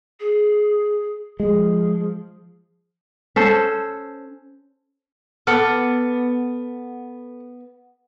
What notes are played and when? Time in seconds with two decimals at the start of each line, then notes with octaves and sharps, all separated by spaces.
0.20 G#4
1.40 F3 G#3 G#4
3.36 C#4 A4 C5
5.47 B3 A4 F#5 D6 F6 C#7